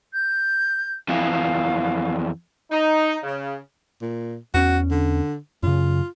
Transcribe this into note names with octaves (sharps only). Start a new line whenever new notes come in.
G6
F2 E3 F5
D#4
C#3
A#2
E2 C#4 F#4
D3
F#2 C#3 F4